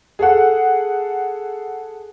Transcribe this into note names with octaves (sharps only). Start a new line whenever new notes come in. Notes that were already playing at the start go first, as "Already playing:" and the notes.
G#4 A4 F#5